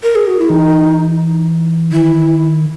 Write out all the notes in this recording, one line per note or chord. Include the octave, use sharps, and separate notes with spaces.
A#4
G#4
F#4
E4
E3 D#4
D#3 E4